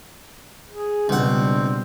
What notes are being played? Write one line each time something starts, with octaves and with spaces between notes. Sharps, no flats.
G#4
C#2 B2 G3 C4 D4 F#5